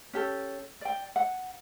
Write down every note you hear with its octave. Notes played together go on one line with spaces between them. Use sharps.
C#4 G4 A4
D5 G5
F#5